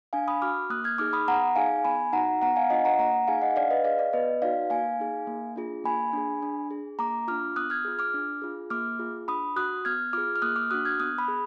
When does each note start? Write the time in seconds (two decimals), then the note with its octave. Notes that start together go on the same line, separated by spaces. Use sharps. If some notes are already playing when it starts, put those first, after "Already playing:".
0.13 D4 F5 G#5
0.28 B5 D#6
0.42 F#4 D6 F6
0.70 A#3 D#6 F#6
0.84 F6 G#6
0.98 D#4 G#4 D6 F6
1.13 B5 D#6
1.28 B3 F#5 A#5
1.56 D#4 G#4 F5 G#5
1.84 B3 G#5 B5
2.13 D#4 F#4 F#5 A#5
2.42 B3 F#5 A#5
2.56 F5 G#5
2.70 D4 F4 D#5 F#5
2.85 F#5 A#5
2.98 A#3 F#5 A#5
3.27 D#4 G#4 F5 G#5
3.42 D#5 F#5
3.56 D4 D5 F5
3.71 B4 D#5
3.84 G#4 D5 F5
3.99 D5
4.13 B3 B4 D#5
4.42 D#4 F#4 D5 F5
4.70 A#3 F5 G#5
5.00 D#4 G#4
5.27 A#3
5.56 D4 F4 G#4
5.84 A#3 G#5 B5
6.13 D4 G#4
6.43 D4
6.71 G#4
6.99 A#3 A#5 D6
7.28 D4 F4 D6 F6
7.56 B3 D#6 F#6
7.70 F6 G#6
7.85 F4 G#4
7.99 D6 F6
8.14 D4
8.42 F4 G#4
8.70 A#3 D6 F6
8.99 F4 G#4
9.28 D4 B5 D#6
9.56 F#4 D#6 F#6
9.85 B3 F6 G#6
10.13 F4 G#4 D6 F6
10.36 F6
10.42 A#3 D#6 F#6
10.56 D6 F6
10.71 D4 F#4 D#6 F#6
10.85 F6 G#6
10.99 B3 D#6 F#6
11.18 B5 D#6
11.28 G#4